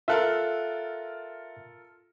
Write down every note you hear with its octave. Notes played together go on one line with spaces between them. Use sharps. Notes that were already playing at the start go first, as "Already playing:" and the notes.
F4 A4 A#4 E5 F5 F#6